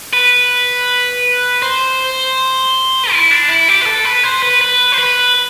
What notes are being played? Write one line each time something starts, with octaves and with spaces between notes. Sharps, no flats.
B4
C5
E4
D4
E4
G4
B4
A4
B4
C5
B4
B4
C5
B4